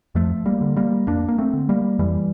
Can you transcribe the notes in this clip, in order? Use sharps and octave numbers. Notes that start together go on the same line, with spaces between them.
F2 F3 A3
G3 A#3
D3
G3 A#3
F2 A#3 D4
A#3
A3 C4
D3
G3 A#3
F2 E3 G3